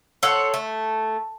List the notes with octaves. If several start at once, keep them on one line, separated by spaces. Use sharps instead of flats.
A4 C5 C#5 F#5
A3